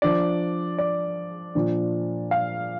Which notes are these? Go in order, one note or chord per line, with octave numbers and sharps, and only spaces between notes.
F3 D4 D5
D5
A#2 F3 D4
F5